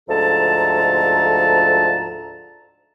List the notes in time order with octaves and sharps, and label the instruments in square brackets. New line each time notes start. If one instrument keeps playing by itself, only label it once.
[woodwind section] D2 G#2 F3 A4 A5 A#5